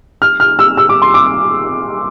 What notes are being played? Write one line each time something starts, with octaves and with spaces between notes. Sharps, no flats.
F6
F6
E6
E6
D6
C6
D6